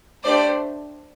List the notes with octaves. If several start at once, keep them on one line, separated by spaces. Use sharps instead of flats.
A3 D4 G4 C5 D5